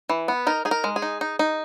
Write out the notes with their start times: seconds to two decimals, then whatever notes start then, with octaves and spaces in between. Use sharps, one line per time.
0.09 E3
0.28 B3
0.47 D#4 A#4
0.65 D#4 G#4
0.71 A#4
0.84 G#3
0.96 G#4
1.02 D#4
1.21 D#4
1.39 D#4